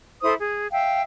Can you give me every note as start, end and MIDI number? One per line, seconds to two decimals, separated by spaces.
0.22 0.33 64
0.22 0.33 69
0.22 0.33 72
0.22 0.33 87
0.39 0.67 68
0.73 1.02 76
0.73 1.02 77
0.73 1.02 79